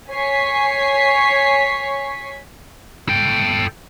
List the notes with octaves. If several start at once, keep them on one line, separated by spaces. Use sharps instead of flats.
C#5 G#5 C#6 B6 C7
A4 G5